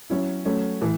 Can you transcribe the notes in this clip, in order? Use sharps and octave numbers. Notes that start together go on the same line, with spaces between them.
F#3 C#4 E4
F#3 A3 C#4
A2 E3